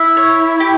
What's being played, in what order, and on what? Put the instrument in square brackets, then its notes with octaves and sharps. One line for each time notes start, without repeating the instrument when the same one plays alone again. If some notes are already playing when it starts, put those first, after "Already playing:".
Already playing: [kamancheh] E4 [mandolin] E5
[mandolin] C#5
G4